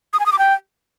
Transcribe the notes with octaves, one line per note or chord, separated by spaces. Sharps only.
D#6
G#5
D#6
D6
G5